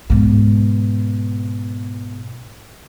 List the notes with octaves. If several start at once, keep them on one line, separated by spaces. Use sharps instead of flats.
G#2 B2